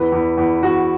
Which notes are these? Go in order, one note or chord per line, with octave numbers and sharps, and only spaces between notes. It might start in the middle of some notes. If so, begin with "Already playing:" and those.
Already playing: E2 B4
E2
E2
E2 F#4